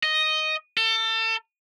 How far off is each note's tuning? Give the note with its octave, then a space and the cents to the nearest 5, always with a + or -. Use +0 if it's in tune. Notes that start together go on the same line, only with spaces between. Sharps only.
D#5 +0
A4 +30